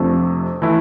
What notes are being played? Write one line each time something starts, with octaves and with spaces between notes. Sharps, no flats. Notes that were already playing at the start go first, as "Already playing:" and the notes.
Already playing: F2 C3 F3 A3 D4
E3 A3 E4